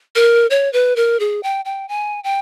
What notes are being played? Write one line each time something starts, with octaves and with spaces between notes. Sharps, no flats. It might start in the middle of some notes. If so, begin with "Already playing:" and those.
A#4
C#5
B4
A#4
G#4
G5
G5
G#5
G5